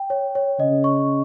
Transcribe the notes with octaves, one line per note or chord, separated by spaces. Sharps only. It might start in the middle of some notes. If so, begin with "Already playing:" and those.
Already playing: G5
C#5
C#5
C#3 D#5
C#6